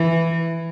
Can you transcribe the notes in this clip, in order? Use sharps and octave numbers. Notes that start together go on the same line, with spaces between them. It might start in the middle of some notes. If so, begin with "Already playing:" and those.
Already playing: E3